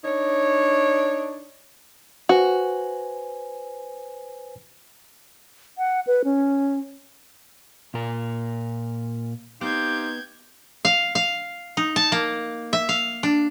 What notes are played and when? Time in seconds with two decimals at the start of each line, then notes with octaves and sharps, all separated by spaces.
0.04 D4 D#4 C#5
2.29 F#4 B4 C5 G#5
5.78 F#5
6.07 B4
6.24 C#4
7.94 A#2 A#4
9.61 B3 C4 D#4 G4 F5 G6 G#6
10.85 F5
11.15 F5
11.77 D#4
11.96 A5
12.12 A#3
12.73 E5
12.89 F5
13.23 D4